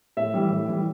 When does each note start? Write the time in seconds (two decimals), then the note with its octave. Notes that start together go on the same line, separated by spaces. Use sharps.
0.17 A2 E5
0.34 E3 G3
0.50 A2
0.67 E3 G3